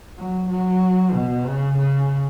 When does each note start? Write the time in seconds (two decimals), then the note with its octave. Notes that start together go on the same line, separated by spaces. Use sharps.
0.18 F#3
0.49 F#3
1.14 B2
1.46 C#3
1.79 C#3